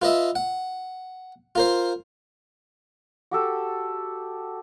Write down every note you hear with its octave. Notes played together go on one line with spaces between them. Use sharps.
F4 B4 D#5 E5
F#5
F4 A#4 C5
F#4 G4 A4